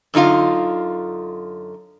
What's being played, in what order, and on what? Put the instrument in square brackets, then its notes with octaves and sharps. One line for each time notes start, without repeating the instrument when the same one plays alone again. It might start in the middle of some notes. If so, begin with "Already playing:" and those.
[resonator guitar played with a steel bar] F#2 D3 D#4 F4 F5